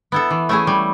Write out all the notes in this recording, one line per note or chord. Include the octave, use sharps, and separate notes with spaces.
B3 E4 A4
E3
A3 C#4 E4 G#4
G3